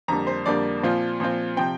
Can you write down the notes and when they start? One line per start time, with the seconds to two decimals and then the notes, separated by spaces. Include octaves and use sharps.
0.08 F2 D3 G3 A#3 A#5
0.27 C5
0.46 F2 D3 G3 A#3 D5
0.83 A#2 F3 C4 F4
1.20 A#2 F3 C4 F4
1.57 C3 F3 C4 G5